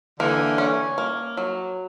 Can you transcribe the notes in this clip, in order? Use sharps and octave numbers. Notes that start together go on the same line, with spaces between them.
D3 E3 A#3
C#4
A#3
F#3